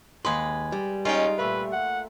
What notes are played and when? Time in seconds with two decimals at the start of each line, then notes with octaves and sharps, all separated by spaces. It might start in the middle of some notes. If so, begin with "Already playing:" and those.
0.25 D#2 G#3 B4 C6
0.72 G3
1.05 G#3 C#4 D#4 F4 G5
1.38 A#2 A3 B4 E5
1.73 F#5